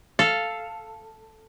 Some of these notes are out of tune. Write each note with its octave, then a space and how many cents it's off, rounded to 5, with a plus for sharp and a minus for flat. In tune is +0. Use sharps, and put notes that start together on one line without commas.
A4 +0 F5 -5